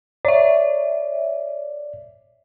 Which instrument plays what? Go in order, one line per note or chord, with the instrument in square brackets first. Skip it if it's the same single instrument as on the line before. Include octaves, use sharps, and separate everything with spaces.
[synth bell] C#5 E5 [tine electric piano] D5